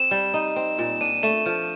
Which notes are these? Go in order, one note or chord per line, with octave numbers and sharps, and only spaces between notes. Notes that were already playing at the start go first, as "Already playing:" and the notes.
Already playing: C4 E7
G3
D#4
C4
A#2
D4 D#7
A3 E7
F3